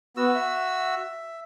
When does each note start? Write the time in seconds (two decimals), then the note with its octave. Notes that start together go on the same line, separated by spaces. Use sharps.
0.17 B3 F#4 E6
0.35 E5